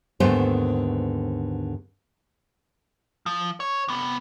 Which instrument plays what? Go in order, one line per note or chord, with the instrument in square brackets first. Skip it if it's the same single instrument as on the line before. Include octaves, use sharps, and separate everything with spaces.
[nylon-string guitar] D#2 G#2 D3 A3 B3 C5
[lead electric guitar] F3
C#5
C3 B3